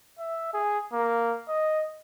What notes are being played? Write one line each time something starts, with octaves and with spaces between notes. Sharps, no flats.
E5
G#4
A#3
D#5